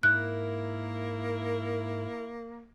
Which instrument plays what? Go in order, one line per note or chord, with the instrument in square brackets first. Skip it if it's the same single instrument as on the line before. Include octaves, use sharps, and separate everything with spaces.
[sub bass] G#2 [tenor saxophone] A#3 [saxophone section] E4 A#4 [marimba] F#6